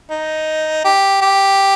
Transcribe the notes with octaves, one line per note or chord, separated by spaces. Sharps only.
D#4
G4
G4